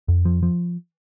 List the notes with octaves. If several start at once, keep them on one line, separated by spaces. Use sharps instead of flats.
F2
F3
F3